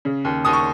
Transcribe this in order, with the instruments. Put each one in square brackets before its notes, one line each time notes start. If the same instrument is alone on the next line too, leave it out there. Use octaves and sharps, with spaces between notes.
[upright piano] C#3
D#2
D#2 D#6
C#6